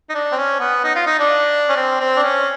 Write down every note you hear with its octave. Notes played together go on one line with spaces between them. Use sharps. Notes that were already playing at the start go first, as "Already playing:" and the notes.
D#4
D4
C4
C#4
B3
D#4
F4
D#4
D4
C#4
C4
C4
D4
C#4